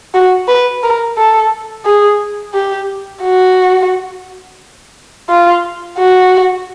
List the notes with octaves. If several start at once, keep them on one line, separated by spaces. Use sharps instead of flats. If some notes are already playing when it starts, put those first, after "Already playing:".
F#4
B4
A#4
A4
G#4
G4
F#4
F4
F#4